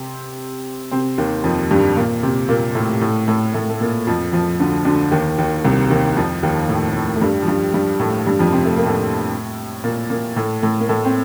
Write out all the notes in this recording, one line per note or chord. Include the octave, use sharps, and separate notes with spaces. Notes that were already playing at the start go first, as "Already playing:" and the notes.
Already playing: C3 C4
C3 C4
D#2 D#3
F2 F3
G2 G3
A#2 A#3
C3 C4
A#2 A#3
A2 A3
A2 A3
A2 A3
A2 A3
A3
A#2 A#3
F2 F3
F2 F3
D2 D3
D2 D3
D#2 D#3
D#2 D#3
C2 C3
D#2 D#3
F2 F3
D#2 D#3
A2
A2
A3
G2 G3
F3
G2 G3
G2 G3
A2 A3
G2 G3
F2 F3
C3 C4
A3
A#3
A2 A3
A#2 A#3
A#2 A#3
A2 A3
A2 A3
A#3
A2 A3
C4